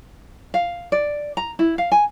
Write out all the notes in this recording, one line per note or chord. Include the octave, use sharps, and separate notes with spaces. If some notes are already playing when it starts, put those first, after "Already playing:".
F5
D5
A#5
E4
F5
G#5